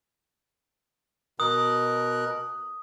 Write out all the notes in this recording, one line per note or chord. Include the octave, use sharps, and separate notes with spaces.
B2 A#4 D#6 F#6